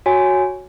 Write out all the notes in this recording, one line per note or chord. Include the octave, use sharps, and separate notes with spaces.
F#4 C#5 G#5